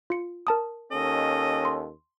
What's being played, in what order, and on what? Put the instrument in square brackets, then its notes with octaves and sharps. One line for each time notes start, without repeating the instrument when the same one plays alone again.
[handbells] F4 C#7
A#4 A5 D#6
[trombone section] D#2 C#4 A4 [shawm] D#5
[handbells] C6